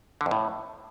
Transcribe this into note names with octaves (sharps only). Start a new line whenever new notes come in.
D3
F2
A2